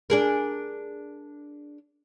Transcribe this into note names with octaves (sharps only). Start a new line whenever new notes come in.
D4 G#4 A#4